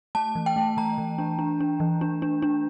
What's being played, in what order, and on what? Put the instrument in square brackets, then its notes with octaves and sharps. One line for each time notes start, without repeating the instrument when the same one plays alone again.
[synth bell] A3 A5
E3
G5
A3
E3 A#5
E3
D4
D4
D4
E3
D4
D4
D4